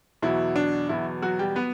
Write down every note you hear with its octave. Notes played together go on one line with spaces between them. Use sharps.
E2 B2 F#3 E4
D4
E2 B2 F#3 E4
F#3 F#4
G3 G4
F#3 B3 B4